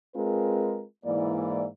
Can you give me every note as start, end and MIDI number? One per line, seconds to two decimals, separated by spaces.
0.15 0.84 56
0.15 0.84 60
0.15 0.84 65
0.15 0.84 68
0.15 0.84 70
0.15 0.84 71
1.05 1.66 44
1.05 1.66 52
1.05 1.66 58
1.05 1.66 64
1.05 1.66 74